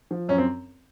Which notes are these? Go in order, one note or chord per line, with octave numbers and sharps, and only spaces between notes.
F3
F#2 C#4
C4